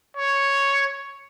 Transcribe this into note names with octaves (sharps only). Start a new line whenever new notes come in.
C#5